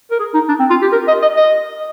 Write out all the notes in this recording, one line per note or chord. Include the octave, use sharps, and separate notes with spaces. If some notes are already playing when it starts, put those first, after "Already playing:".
A#4
G#4
D#4
D4
C4
F4
G4
A#4
D#5
D#5
D#5